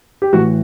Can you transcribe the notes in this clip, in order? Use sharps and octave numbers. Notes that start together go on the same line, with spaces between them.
G4
A2 E3 F#4